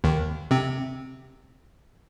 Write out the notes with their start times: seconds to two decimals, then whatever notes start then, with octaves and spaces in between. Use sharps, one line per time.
0.04 D#2 D#3
0.51 C3 C4